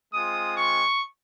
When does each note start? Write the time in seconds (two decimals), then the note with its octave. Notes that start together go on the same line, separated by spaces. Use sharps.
0.12 G#3 C4 F4 D#6
0.56 C#6